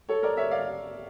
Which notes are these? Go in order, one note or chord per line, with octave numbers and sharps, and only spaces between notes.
A4 C#5
A#4 D5
C#5 E5
D5 F5